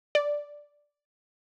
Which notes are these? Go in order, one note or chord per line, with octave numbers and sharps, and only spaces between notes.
D5